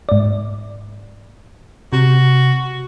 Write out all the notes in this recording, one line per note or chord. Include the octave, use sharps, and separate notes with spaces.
G#2 D5
C3 F#4